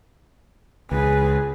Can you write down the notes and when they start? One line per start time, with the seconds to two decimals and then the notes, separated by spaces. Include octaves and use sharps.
0.91 C#2 G#4 B4